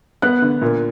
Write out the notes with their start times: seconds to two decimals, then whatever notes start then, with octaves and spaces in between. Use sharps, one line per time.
0.22 B3 F#6
0.42 D3
0.62 A#2